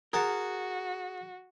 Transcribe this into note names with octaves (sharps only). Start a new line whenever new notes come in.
F#4 G#4 A#4 F#5 A5